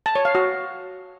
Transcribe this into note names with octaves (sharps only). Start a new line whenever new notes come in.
A5
C#5
F5
F#4